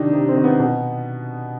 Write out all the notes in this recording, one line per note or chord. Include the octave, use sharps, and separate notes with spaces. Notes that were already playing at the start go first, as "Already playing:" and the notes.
Already playing: C3 D#3 D4 D#4
C3
C4
D#3
B3
B2